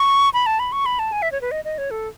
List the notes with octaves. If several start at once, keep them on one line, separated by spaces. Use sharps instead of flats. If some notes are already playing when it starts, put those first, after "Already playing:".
Already playing: C#6
B5
A5
B5
C#6
B5
A5
G#5
E5
C#5
B4
D#5
D#5
C#5
A4